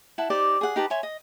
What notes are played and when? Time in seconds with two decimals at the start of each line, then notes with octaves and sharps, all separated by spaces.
0.18 E4 F#5 A5
0.30 D#4 G4 C5 D5
0.61 G#4 F#5
0.76 D#4 G4 B4 A5
0.90 C#5 E5 G#5 C6
1.03 D#5